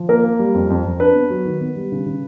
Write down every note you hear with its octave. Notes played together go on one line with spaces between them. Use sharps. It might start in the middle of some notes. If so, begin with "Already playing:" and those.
Already playing: F3
A#3 A#4
A#3
G3
F2
F2
F2
D4 B4
B3
F#3
D#3
B3
G3
C#3
C#3